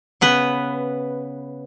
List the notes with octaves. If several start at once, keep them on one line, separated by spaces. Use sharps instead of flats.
C#3 B3 B4